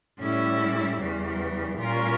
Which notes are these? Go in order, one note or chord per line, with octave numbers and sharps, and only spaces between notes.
A2 G3 C#4 E4
E2 C#3 E3 G3
A#2 G3 C#4 F4 A#4